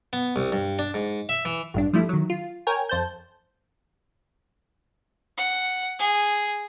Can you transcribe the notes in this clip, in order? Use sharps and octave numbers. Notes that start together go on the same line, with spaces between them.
B3
C2
G2
D4
G#2
E5
E3
A1 G2 D4
F3 G3 A3 E4
D#3 F#3
F4
A#4 C#5 G5 G#5
F2 C5 A5 G6
F#5
G#4